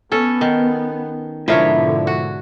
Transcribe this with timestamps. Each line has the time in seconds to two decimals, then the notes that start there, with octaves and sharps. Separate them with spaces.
0.12 B3 C#4 A4
0.41 D#3
1.48 G#2 B2 D3 F3 E4 A#4 C#5 E5
2.07 F#4